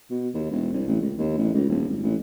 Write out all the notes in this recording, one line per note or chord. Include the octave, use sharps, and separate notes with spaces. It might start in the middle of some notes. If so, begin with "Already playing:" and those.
B2
D#2
E1
C2
A1
C#2
D#2
A1
C#2
D#1
G#1
A1